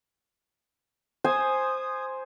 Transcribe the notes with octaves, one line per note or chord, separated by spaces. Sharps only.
C5 G#5 D#6